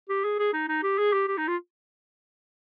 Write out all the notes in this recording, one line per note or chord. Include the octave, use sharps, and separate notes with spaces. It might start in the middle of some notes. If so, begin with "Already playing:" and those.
G4
G#4
G#4
D#4
D#4
G4
G#4
G4
G4
D#4
F4